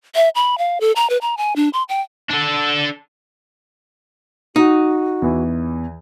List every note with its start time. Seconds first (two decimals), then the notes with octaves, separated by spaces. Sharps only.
0.15 E5
0.35 B5
0.58 F5
0.81 A4
0.96 A#5
1.10 B4
1.22 A#5
1.37 G#5
1.56 D4
1.73 C6
1.89 G5
2.29 D4 A4
4.56 D#4 F#4
5.22 E2 E3